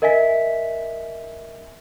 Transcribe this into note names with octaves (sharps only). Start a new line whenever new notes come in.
A#4 D#5 E5 G#5 B6